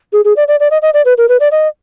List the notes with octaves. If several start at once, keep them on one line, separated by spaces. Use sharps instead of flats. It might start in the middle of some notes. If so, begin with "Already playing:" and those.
G#4
G#4
D5
D5
D5
D#5
D#5
D5
B4
A#4
B4
D5
D#5